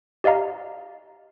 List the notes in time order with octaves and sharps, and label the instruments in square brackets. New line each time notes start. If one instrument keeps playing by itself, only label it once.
[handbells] G4 D5 D#5 F5 A#5